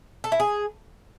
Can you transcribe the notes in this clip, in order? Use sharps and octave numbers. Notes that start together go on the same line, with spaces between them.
A4
E4
G#4